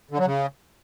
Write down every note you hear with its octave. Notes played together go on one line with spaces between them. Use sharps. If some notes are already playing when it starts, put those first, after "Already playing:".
D3
F#3
C#3